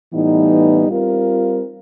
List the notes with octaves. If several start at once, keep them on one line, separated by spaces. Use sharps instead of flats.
A2 E3 G3 B3 D#4
G3 C4 F4 A#4